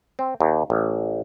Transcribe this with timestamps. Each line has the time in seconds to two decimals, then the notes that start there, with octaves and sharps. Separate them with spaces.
0.19 C4
0.40 D#2
0.70 A1